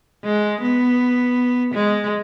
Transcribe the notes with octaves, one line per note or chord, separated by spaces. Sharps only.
G#3
B3
G#3